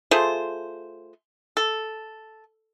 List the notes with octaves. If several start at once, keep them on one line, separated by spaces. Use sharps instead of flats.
A3 F4 G#4 C5
A4